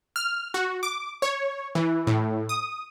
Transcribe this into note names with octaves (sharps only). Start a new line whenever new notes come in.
F6
F#4
D6
C#5
E3
A2
D#6